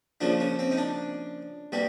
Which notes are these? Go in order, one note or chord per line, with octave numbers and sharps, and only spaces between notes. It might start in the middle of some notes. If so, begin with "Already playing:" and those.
C#3 F3 A#3 D4
C#4
C4
D#4
D4
B2 G3 A#3